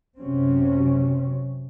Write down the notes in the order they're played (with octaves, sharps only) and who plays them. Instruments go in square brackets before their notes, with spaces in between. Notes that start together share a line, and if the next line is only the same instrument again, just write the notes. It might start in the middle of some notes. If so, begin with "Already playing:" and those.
[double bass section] F#1 C3 F#3 C4 C#4